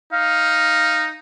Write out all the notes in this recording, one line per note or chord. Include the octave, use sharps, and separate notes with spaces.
D#4 F5